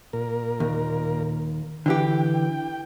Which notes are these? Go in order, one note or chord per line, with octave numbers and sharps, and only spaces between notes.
A#2 A#4
D#2
D3 E3 G4 G5